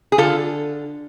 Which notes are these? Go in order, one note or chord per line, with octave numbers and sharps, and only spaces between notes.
G#4
D3 F4 A4